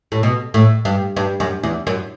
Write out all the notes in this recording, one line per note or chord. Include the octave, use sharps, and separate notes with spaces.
A2
B2
A2
G2
G2
F#2
E2
F#2